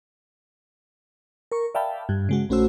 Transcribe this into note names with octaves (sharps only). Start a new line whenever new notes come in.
A#4 C#6
D5 E5 F5 G5 A5 B5
G2
C#3 G#3 F#4
A#1 A3 C#4 F#4 C5 E6